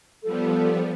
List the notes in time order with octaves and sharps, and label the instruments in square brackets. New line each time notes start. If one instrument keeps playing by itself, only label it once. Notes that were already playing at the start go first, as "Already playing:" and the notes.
[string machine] F3 G3 B3 [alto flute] A4